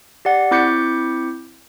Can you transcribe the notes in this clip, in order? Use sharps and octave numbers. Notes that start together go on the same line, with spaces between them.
G4 D5 F#5
C4 E4 D6 G6 B6 C#7